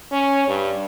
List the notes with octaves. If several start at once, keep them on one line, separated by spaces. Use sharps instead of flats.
C#4
G2